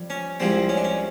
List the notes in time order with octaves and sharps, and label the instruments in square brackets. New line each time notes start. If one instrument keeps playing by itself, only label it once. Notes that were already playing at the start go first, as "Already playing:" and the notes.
Already playing: [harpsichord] F2 G3
C#4
C2 C3 F3 G#3 C4
C#4
D4
C#4